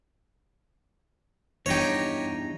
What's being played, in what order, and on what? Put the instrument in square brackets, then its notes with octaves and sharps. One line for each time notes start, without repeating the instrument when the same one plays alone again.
[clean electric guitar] E2 G2 D#4 [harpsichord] G4 C#5